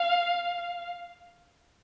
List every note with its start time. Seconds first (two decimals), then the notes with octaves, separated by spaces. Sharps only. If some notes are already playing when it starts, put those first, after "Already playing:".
Already playing: F5